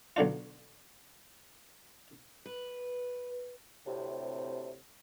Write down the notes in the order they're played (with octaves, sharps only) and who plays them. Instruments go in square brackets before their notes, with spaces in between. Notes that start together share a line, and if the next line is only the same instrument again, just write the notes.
[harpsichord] B1 D3 D4 F4
[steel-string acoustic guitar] B4
[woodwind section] D2 A2 C3